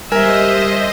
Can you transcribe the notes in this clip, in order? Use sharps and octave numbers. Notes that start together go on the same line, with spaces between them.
G3 A#4 C5 D#5 E5 G#5